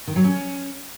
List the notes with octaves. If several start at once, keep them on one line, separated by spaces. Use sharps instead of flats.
D#3
F#3
C#4